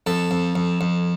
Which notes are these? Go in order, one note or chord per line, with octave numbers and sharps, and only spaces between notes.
F2 A4
F2
F2
F2